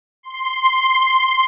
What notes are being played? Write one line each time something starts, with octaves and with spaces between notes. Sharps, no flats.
C6